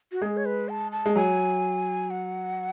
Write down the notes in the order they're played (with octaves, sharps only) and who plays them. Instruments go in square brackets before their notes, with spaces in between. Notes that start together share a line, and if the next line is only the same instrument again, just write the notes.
[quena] F#4
[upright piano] G#3 [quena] G#4
[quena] C#5
B4
A5
A5
[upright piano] G#3
[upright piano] F#3 [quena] G#5
[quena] F#5